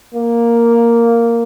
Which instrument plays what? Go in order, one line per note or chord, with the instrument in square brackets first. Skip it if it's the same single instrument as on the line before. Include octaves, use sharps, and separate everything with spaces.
[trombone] A#3